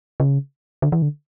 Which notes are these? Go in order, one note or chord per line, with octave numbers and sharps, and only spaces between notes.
C#3
D3
E3
D3